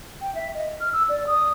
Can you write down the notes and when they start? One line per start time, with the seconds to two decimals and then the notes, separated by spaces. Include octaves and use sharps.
0.21 G5
0.35 E5
0.55 D#5
0.80 F6
0.93 E6
1.09 D5
1.27 D#6